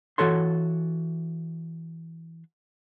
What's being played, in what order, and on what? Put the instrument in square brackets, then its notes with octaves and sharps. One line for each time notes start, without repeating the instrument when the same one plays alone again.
[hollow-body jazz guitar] E3 F#4 A4 C#5 C6